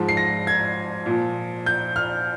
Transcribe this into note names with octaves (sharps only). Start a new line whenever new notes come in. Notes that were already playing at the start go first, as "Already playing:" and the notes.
Already playing: G#2 F3
C7
A#6
G#6
A#2 F3
G6
F6